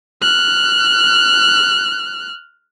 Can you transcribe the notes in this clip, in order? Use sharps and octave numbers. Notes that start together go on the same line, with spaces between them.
F6 F#6